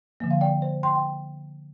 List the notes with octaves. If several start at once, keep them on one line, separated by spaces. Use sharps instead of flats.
D3 F3 A#3
F5
D5 G5
C5
G5 C6
G5